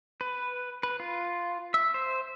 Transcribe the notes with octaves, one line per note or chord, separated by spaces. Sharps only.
B4
B4
F4
E5
C5